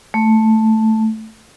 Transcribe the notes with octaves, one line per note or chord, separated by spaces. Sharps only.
A3